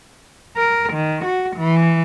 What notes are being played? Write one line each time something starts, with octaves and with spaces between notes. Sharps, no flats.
A#4
D#3
F#4
E3